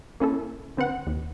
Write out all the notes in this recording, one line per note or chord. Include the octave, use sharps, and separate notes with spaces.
A#3 C#4 E4 A4
D3 C4 B4 F#5
D#2